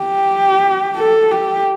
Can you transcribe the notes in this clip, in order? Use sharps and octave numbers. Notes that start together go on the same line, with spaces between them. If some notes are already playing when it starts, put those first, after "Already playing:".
Already playing: G4
A4
G4